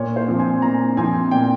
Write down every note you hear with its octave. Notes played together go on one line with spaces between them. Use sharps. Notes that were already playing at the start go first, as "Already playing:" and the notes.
Already playing: A#2 C#5
C5
F3 C4
G#5
A#2 A#5
F3 C4 G#5
A#2 G5